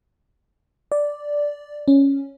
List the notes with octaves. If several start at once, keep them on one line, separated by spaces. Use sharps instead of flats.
D5
C#4